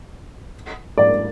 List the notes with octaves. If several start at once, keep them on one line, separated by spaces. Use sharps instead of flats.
D5